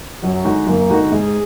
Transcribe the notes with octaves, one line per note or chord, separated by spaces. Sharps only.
F#2 F#3
D3 G#3 D#4 F#4
F#2 A#3
D3 G#3 D#4 F#4
G#2 G#4